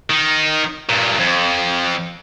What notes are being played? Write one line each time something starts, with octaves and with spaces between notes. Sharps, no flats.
D#3
G2 A#2
F2